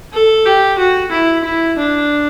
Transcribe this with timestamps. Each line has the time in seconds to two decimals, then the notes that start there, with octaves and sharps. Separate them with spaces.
0.13 A4
0.46 G4
0.78 F#4
1.11 E4
1.44 E4
1.78 D4